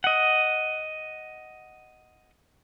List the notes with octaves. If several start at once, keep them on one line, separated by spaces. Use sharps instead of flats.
D#5 F#5